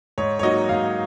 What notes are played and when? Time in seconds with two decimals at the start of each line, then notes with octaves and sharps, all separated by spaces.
0.18 G#2 C#5
0.39 C#5
0.43 F#3 A#3 D#4 F#4 D#5
0.69 G#2 F5